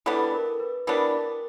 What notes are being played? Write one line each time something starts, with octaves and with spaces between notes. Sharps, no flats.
E3 G3 B3 D4 A4
A#4
B4
E3 G3 B3 D4 A#4